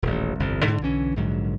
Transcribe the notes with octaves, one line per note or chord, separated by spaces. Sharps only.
D#1 A1
G1 C2 F2
G#2 D3
B1 D3 E3 C#4
A#1 G#2 D3 F#3